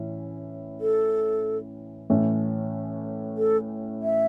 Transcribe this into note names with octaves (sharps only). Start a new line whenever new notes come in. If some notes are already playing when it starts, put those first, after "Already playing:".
Already playing: A2 E3 C#4 E4
A4
A2 E3 A3 C#4
A4
E5